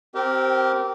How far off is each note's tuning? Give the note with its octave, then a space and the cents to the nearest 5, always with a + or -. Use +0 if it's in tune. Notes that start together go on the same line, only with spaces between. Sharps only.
C4 +0 G4 -25 A#4 +0